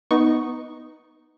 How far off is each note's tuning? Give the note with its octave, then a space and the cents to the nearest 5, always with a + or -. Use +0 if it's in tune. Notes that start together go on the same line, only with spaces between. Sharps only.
B3 +0 D#4 +0 C#6 +0